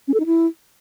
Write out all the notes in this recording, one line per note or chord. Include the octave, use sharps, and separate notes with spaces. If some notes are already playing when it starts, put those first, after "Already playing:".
C#4
A4
D#4
E4